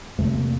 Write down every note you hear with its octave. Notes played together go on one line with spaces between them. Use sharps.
E2 C3 A3
A#3